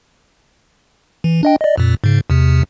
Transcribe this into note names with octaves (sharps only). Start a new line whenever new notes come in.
E3
D4 D#5 G5
D5 D#5
F2 A#2
G#2 C#3
E2 C3